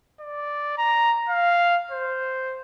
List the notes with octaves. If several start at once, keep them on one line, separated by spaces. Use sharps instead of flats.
D5
A#5
F5
C5